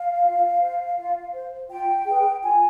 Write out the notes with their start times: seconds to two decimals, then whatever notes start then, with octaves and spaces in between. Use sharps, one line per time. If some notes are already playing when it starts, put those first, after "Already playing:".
Already playing: F5
0.24 F4
0.60 C5
0.97 F4
1.33 C5
1.70 F4 G5
2.06 G#4 B4
2.43 F4 G#5